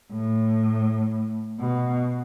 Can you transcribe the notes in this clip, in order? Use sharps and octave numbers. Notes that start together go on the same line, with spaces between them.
A2
B2